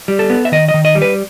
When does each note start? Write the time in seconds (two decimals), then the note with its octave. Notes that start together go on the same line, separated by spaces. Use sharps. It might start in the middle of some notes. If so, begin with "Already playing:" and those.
0.08 G3
0.19 A4
0.30 B3
0.45 E5
0.52 D#3 D#5
0.68 D#5
0.74 D#3
0.85 D#5
0.95 G3
1.02 B4